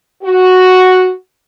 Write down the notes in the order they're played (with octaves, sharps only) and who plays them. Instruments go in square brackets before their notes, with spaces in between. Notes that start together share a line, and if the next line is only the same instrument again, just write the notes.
[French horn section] F#4